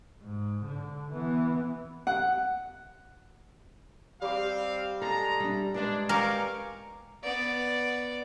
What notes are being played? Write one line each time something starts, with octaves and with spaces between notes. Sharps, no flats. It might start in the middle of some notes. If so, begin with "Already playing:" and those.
G#2
D3
E3 B3
F#5
G3 C4 F5 D6
G#3 A4 A#5
G3 D4
G#3 D4 B4 D5
A#4 F5 G5 G#5 C#6 D6
B3 D5